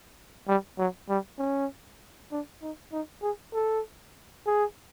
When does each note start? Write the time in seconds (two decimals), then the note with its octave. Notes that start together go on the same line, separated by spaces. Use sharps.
0.48 G3
0.78 F#3
1.09 G3
1.38 C#4
2.31 D4
2.62 D#4
2.92 D#4
3.22 G#4
3.53 A4
4.46 G#4